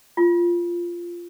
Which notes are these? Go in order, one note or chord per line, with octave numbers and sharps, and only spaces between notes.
F4